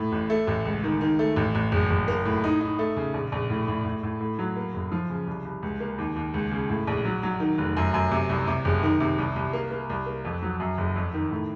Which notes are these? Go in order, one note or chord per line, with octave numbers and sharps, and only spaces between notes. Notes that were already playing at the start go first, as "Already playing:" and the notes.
Already playing: A2
A1
A3
A1
C#2
D#3
D#3
A3
A1
A1
F#1
F#1
A#3
A2
D#4
D#4
A3
C#3
A#1
A#1
A2
A2
A2
A2
A2
F#3
A#3
F#1
F3
C#3
C2
C2
C#2
A#3
D#2
D#2
C#2
C#3
A2
A#1
F#3
F#3
D#3
F1
F#2
F#2
C3
C2
C3
F#1
D#3
C3
C2
C2
A#3
A#3
C2
A#3
F2
F#3
F#2
F#1
F2
D#3
A2